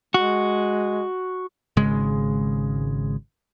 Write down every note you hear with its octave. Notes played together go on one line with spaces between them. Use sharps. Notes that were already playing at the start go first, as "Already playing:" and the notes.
G#3 F#4
G#1 C#3 G#3